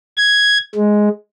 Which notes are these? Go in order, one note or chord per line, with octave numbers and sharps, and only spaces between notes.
G#6
G#3